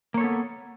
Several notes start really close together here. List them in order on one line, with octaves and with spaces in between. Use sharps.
A#3 C#5 A4 B3